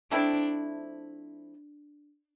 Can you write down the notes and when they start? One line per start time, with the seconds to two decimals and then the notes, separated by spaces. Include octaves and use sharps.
0.11 F3 A3 C4 D4 E4